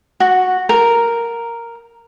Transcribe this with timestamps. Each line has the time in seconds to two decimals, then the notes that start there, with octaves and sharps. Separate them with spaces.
0.20 F#4
0.69 A#4